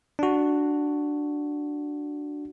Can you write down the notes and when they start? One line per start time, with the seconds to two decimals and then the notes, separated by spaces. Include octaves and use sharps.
0.19 D4 F#4